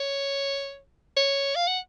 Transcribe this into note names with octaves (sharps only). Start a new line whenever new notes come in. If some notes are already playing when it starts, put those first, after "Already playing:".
Already playing: C#5
C#5
F5
F#5